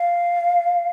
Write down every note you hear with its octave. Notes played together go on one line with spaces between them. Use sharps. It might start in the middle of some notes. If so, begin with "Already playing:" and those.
Already playing: F5